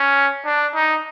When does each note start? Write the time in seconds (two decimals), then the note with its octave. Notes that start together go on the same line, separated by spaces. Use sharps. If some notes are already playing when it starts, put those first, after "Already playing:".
Already playing: C#4
0.45 D4
0.75 D#4